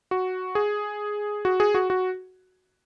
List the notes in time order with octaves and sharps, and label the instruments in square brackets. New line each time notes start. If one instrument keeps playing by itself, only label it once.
[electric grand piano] F#4
G#4
F#4
G#4
F#4
F#4